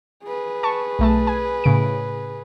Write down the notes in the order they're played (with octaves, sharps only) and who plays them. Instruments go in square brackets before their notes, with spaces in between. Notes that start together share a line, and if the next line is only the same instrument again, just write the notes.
[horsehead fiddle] G#4 B4
[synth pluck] A5 C#6
B1 A3 A5
G#5
A2 C#3 D7